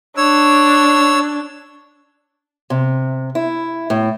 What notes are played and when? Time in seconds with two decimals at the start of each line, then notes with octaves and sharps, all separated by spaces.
0.17 D4 C#5 E6
2.70 C3
3.35 E4
3.90 A2